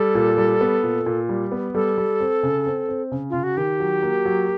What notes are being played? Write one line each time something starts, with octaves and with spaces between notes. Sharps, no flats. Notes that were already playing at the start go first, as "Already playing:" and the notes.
Already playing: G3 A4
A#2
G3
B3
A#2
A#2
G3
B3
G3 A4
G3
C4
C#3
C4
C4
C#3
C#3 F4
F#4
D#3 G4
F#3
A#3
F#3